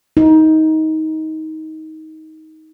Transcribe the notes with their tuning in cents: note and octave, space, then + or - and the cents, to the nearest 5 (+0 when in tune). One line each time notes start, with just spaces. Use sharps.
D#4 +20